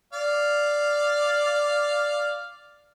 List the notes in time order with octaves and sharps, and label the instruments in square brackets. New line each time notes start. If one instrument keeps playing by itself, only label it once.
[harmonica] D5 F5